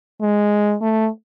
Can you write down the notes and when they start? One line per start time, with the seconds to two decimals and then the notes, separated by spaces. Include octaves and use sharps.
0.22 G#3
0.81 A3